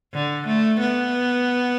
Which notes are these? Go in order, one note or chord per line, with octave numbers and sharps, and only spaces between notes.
D3
A3
B3